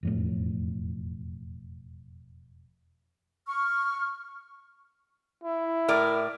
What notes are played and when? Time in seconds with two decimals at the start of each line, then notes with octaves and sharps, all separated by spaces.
0.03 E1 F2 A2
3.46 C#6 F6
5.44 E4
5.88 A2 A#4 D5